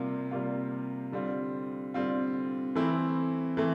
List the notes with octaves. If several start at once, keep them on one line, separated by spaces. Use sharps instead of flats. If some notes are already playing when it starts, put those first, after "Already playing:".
Already playing: C3 G3 A#3 F4
C3 G3 A#3 F4
D3 G3 C4 F4
D3 G3 C4 F4
E3 A3 C4 E4
E3 A3 C4